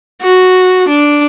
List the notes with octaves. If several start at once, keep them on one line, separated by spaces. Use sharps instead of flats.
F#4
D4